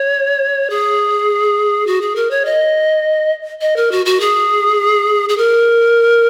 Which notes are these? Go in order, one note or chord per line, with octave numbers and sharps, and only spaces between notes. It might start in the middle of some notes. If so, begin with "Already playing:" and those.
Already playing: C#5
G#4
F#4
G#4
A#4
C#5
D#5
D#5
A#4
F#4
F#4
G#4
G#4
A#4